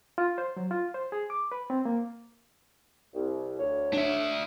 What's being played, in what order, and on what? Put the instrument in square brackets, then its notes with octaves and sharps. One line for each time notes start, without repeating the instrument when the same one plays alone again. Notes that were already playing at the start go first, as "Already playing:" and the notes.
[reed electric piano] F4
C5
F#3
F4
C5
G#4
D6
B4
C4
A#3
[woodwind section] C2
D2 C#5
[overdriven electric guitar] D4 E5